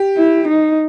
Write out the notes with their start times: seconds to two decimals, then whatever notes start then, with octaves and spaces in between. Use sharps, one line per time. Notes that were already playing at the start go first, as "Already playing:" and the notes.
Already playing: G4
0.17 E4
0.48 D#4